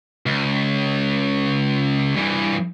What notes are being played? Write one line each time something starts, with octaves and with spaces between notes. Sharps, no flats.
C#2
G2 E3